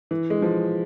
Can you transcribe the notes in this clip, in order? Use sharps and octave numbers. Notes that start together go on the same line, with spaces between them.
E3
G#3
F3